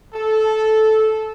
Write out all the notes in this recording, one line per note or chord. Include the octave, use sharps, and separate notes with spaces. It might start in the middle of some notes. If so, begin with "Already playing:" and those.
A4